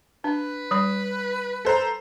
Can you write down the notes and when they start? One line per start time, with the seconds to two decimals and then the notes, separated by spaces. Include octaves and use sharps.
0.24 D4 B4
0.71 G3 B5
1.65 A4 C5 A#5